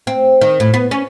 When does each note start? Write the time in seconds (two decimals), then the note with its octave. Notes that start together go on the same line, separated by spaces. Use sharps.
0.07 C4
0.41 D#3
0.60 A2
0.74 B3
0.91 C#4